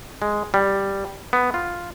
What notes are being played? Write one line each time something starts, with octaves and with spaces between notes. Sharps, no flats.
G#3
G3
B3
F4